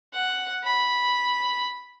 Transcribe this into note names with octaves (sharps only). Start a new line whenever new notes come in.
F#5
B5